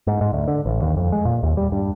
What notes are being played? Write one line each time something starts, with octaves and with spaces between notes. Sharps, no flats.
G#2
G#2
D2
D3
A1
D#2
F2
G#3
A#2
D#2
G3
G2